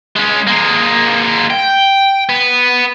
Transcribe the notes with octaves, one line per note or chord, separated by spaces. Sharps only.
G#3 C#4
G#3 A#3
G5
B3